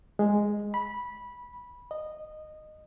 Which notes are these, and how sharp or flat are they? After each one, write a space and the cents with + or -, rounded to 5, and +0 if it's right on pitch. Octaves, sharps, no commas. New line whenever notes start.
G#3 -5
B5 -15
D#5 -15